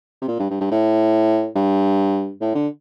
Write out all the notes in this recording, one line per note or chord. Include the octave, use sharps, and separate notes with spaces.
C3
A#2
G2
G2
G2
A2
G2
A2
D3